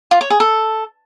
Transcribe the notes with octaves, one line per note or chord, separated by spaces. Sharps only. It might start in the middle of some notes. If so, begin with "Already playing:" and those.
F4
C#5
G#4
A4